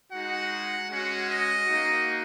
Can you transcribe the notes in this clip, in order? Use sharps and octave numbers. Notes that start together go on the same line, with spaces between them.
G#3 D#4 F#4 F#5
G#3 C#4 F#4 F#5
D#5
A#3 D#4 F#4